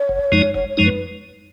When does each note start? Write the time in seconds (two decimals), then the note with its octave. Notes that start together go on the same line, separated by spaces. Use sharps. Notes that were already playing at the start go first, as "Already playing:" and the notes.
Already playing: C#5
0.09 F#1
0.32 F#2 F3 G#3 D#4
0.54 F#1 C#5
0.70 C#5
0.77 F#2 F3 G#3 D#4
0.85 B4